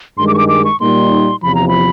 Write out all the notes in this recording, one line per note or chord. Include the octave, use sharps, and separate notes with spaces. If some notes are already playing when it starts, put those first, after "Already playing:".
G2 D#3 G#3 C6
D6
C#6
D6
D6
C#6
A#2 G3 A#3 D#4 C6
E2 C3 F3 B5
A#5
B5